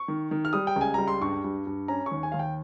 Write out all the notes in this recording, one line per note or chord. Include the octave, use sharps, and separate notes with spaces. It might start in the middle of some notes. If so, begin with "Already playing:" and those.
Already playing: C#6
D#3
D#3
F6
G3 D#6
G5
C#2 G#5
G3 A#5
C6
G2 C#6
G2
G2
C#4 A#5
C#6
D#2
G#5
D#2 F5
G5